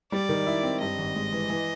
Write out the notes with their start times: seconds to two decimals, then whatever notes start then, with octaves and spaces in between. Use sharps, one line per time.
0.12 G3 D5
0.29 D#3
0.47 E4
0.63 C4
0.81 G2 D#5
0.98 G#1
1.15 G#3
1.32 E3
1.50 E3